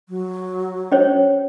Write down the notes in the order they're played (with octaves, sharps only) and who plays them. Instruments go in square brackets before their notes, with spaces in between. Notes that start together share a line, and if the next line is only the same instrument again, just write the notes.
[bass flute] F#3
[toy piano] C#4 C5 C#5